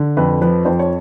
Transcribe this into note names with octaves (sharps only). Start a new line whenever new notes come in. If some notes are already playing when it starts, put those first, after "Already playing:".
Already playing: D3
F2 B4
F3 B4
F2 C5
C#5